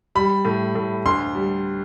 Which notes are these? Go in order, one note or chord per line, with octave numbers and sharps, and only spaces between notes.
G3 B5
A2
A2
D2 C6
G3